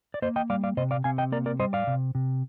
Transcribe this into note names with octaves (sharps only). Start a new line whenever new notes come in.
D5
A#3 C5 D#5
D#5 G5
G3 D5 F5
D5 F5
C3 C5 D#5
D5 F5
C3 F5 G#5
D#5 G5
A#3 A#4 D5
A#4 D5
G3 C5 D#5
D5 F5
C3
C3